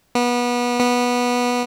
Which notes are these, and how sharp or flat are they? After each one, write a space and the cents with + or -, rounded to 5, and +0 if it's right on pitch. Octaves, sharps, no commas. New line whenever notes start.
B3 -25
B3 -15